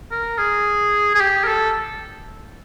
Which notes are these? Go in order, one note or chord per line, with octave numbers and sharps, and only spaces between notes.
A#4
G#4
G#4
G4
A#4
A4